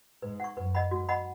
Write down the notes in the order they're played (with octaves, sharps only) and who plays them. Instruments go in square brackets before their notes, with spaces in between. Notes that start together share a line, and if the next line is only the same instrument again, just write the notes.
[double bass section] G#2 [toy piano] B4
[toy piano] F#5 C#6
[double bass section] F#2 [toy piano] B4
[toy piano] D#5 F#5 B5
[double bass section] G#2 [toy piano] F#4
[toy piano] D#5 F#5 B5